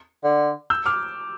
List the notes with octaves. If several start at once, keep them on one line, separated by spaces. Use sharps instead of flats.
D3
E6 G6
D6 F6